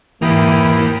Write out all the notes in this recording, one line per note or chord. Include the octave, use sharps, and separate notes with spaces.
G#2 E3 A#3 E4 G4 G5 D#6